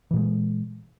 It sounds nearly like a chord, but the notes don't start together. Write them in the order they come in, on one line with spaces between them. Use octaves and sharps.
E3 A#2 G#3